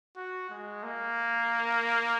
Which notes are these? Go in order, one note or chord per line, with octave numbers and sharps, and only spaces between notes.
F#4
G#3
A#3